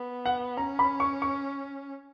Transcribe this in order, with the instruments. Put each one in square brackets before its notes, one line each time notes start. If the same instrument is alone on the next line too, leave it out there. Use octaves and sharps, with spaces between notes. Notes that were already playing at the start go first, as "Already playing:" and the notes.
Already playing: [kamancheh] B3
[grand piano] F#5
[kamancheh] C#4 [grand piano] A#5
[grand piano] B5
C#6
C#6